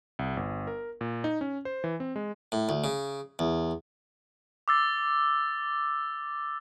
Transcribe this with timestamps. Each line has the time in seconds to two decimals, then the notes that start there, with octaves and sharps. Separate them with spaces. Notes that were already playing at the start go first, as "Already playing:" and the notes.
0.19 C2
0.37 G1
0.67 A#4
1.01 A#2
1.24 D#4
1.41 C#4
1.65 C5
1.84 E3
2.00 C4
2.16 G#3
2.52 A2
2.69 D2
2.84 C#3
3.39 E2
4.68 D6 E6 A6